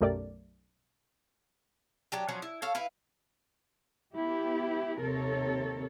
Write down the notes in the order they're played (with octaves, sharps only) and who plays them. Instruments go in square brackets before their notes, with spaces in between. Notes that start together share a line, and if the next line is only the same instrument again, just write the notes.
[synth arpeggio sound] B1 F#2 A3 G4 A#4 D5
[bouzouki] F#3 D4 G4
F3 F#3 C#4 F#5
E4
A4 C#5 F5
E4 B4 F5
[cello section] B3 E4 G4
D#2 C3 A4 A#4 C#5